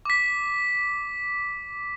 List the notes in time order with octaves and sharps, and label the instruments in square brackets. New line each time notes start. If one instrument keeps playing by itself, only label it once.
[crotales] D6 B6